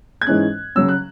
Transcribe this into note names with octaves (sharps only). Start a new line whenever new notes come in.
G#6
G#2 E3 G#3 C#4 F#6
C#3 F#3 C#4 E6
F#6